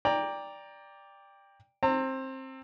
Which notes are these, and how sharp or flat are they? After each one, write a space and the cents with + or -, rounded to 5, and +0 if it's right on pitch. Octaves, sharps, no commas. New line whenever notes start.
D5 -5 G5 +20 A#5 +0
C4 +20 A#5 -40